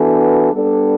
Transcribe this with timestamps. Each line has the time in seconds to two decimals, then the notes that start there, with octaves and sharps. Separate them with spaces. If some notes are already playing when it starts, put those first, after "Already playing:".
Already playing: E3 B3 D4 F#4 A4
0.52 G3 B3 D4 A4